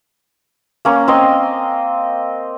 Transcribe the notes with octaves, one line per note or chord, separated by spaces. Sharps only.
A#3 C#4
C4 D#5